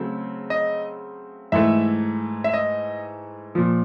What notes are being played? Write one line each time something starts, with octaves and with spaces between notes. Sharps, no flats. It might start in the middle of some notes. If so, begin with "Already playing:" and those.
Already playing: C#3 F#3 A3 C4
D#5
G#2 E3 A3 E5
E5
D#5
A#2 F3